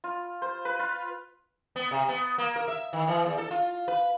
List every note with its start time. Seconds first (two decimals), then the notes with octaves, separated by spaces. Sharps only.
0.04 F4
0.42 C5
0.65 B4
0.79 F4
1.76 B3
1.91 C3
2.09 B3
2.38 A#3
2.56 A#4
2.68 E5
2.93 D#3
3.08 E3
3.26 E2
3.38 A4
3.51 F4
3.88 B4